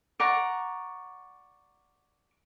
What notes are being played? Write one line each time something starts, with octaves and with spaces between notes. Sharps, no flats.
D5 F#5 A#5 C#6